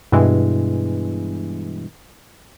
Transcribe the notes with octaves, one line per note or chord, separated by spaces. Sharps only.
G2 B2 E3 G#3